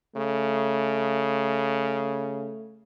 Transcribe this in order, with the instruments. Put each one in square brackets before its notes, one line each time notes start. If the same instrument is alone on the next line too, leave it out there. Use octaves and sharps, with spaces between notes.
[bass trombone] C#3 [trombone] A3